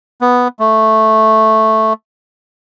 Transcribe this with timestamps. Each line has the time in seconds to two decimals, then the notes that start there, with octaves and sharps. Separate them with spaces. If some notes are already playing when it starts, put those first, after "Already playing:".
0.21 B3
0.60 A3